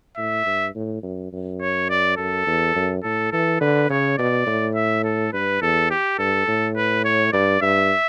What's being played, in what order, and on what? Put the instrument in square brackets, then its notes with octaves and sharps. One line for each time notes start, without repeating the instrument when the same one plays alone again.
[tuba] A2 [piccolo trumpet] E5
[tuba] G2
A2
F#2
F#2
[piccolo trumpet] C#5
D5
[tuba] F#2 [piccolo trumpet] A4
[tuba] E2
F#2
[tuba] A2 [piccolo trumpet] A4
[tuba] E3 [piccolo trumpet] A4
[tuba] D3 [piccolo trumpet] B4
[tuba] C#3 [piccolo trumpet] C#5
[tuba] B2 [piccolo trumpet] D5
[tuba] A2
[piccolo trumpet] E5
A4
[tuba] G2 [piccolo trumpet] B4
[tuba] E2 [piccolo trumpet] A4
[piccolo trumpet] G4
[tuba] G2 [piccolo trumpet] A4
[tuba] A2
[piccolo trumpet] B4
C#5
[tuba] G2 [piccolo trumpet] D5
[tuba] G2 [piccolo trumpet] E5